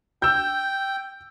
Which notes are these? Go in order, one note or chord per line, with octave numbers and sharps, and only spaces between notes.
G5 E6 G6